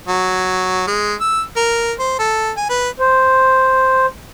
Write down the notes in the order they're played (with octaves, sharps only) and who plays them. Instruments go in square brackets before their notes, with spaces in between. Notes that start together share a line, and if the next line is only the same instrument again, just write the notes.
[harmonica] F#3
G#3
E6
A#4
C5
A4
G#5
B4
[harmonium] C5